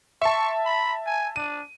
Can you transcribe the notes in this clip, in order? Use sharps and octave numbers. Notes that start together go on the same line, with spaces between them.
E5 A5 C#6
B5
G#5
D4 D#7